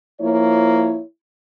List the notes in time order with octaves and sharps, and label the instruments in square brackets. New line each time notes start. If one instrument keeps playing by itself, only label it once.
[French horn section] F3 A#3 E4 C#5